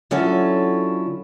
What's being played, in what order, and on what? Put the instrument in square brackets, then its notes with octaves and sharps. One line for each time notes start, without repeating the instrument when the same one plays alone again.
[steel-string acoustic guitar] D3 F#3 C#4 E4 F4 A4